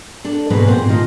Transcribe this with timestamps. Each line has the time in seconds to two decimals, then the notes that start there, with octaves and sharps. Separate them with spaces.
0.24 D4 A4
0.50 E2 G#2 B2 G#3 A#3 B4
0.68 A#2 C4
0.89 D#3 A3 F4 D#5